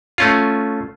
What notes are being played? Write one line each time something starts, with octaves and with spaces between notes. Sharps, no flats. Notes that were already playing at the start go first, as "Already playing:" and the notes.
A3 C#4 F4